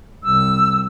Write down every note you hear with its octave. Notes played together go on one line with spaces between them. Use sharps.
C2 E6